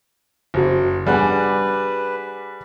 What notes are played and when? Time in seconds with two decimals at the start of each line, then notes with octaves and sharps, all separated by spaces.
0.54 F#1 F#4 C5
1.07 G3 D4 G#4 B4 F#5 G#5 F#6